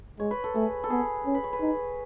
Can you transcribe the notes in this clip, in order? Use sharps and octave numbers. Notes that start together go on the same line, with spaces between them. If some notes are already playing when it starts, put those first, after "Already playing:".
G#3 C#5
B4
A4
A3 G#4
A4
B3 G#4
C#4
B4
C#5
B4
D#4